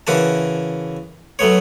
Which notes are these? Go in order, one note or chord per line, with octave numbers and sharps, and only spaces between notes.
C#3 E3 F#4 A#4 A5
F#3 A3 B3 C#5